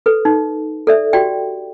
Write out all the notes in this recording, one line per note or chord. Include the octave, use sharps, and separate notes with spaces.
A4 B4
D#4
A4 D5 E5
F#4 G4 D5 G5